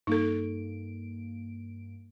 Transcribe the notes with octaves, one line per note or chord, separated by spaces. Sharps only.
G2 A#3 D#4 A4 D7